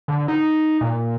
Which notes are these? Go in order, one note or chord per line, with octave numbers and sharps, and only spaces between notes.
D3
D#4
A#2